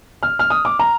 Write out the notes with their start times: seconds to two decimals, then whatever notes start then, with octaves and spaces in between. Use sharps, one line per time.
0.23 F6
0.39 F6
0.50 D#6
0.65 D6
0.79 A#5